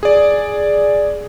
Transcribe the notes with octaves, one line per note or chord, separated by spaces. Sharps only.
G#4 D5